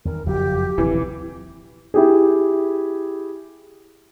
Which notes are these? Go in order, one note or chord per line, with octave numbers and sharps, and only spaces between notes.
E2 D#3 A#4
F#1 F2 F#3 G4
D#1 A#1 C3 E3 F#3
E4 G4 G#4